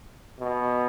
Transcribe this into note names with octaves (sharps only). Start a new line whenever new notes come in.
B2